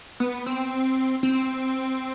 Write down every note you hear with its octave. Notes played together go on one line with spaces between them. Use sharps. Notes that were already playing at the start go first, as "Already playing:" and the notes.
B3
C4
C4